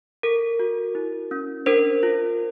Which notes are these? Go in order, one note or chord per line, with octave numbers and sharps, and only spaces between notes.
A4 A#4
F#4
E4
C#4
D4 A#4 C5
F4